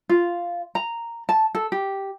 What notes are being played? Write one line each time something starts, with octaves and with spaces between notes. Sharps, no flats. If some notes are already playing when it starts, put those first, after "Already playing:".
F4
A#5
A5
A4
G4